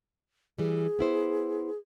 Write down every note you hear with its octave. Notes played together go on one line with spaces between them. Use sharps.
E3 G3 G#4
B3 E4 C5